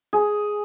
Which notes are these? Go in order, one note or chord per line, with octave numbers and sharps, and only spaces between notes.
G#4